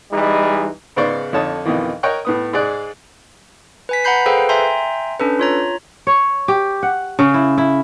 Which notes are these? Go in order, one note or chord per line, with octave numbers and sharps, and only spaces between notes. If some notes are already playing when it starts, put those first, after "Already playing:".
E3 G3 G#3 D#4
G#2 C#3 B3 C5 D5 C#6
F2 D3 D#4 C#5 A5 D#6
F2 B2 D#3 E3
A#4 C#5 D#5 G5 C#6 F#6
A2 B3 D#6
G#2 G#4 D5 F#6
B4 G#5 B6
F#5 A#5 B5 G6 C7
G#4 A4 B4 C5 F5 G5
E5 G5 G#5 A#5 C6 G6
C#4 D4 A4 B4
F4 C#5 A#5
C#5
G4
F#5
C#3
E4
E4